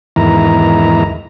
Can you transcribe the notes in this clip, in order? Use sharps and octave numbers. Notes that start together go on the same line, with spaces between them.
E2 G#2 D#3 E4 A#5